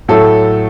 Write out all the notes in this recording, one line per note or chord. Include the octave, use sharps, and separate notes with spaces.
A2 F#3 A3 A4